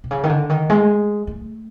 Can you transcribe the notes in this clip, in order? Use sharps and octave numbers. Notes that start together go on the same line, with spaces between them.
C3
C#3
D#3
D3
D#3
G#3
A3